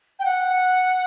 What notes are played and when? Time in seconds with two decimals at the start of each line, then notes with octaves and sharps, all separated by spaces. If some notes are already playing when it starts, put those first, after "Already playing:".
0.19 G5
0.25 F#5